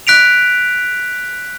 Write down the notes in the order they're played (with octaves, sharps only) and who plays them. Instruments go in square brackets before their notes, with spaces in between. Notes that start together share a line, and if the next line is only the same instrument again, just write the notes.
[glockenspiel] F#6 B6 D7 F7